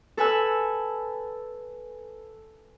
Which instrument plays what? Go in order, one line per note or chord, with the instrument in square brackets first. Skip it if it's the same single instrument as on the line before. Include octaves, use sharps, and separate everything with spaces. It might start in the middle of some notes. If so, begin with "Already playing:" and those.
[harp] A4 B4 G#5 E6